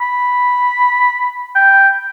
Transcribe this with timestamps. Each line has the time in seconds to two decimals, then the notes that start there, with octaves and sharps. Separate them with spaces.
0.01 B5
1.55 G5